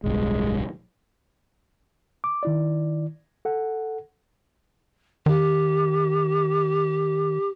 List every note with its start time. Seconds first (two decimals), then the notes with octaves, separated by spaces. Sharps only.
0.04 D1 B1 G2 G#3
2.24 D6
2.43 D#3 E4 D5
3.45 A4 F#5
5.26 D#3 G4